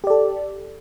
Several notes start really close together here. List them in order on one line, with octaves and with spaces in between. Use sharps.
G4 D5 A4